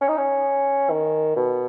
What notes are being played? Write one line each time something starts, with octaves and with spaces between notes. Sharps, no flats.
C#4
D#4
C#4
D#3
B2